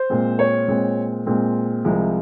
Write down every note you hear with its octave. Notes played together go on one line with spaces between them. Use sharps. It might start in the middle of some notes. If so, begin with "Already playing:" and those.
Already playing: C5
A#2 G#3 C4
C#5
A#2 G#3 C4
A#2 G#3 C4
C2 C3 F3 G#3